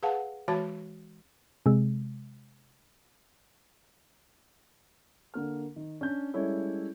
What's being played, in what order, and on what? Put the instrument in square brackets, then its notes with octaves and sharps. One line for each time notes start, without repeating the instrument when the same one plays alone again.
[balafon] G#4 B4 F5 F#5 A5
E3 G#3 F#4 C#5 A5
[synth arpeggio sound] C3 G#3
[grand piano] D3 A#3 F6
D#3
C#4 D4 G6
G3 G#3 C#4 E4 A4 C#5